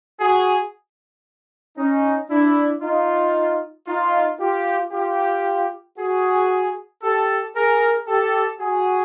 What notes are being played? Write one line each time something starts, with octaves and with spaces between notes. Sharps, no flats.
F#4 G#4
C#4 D#4
D4 E4
D#4 F4
D#4 F4
F4 G4
F4 G4
F#4 G#4
G4 A4
G#4 A#4
G4 A4
F#4 G#4